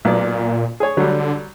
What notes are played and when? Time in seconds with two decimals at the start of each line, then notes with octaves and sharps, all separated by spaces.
0.05 B1 A#2 D5
0.80 G#4 C#5
0.97 D3 F#3 G3